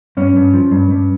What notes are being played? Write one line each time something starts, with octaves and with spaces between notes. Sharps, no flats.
G2 C#4
G2
F3
G2
G2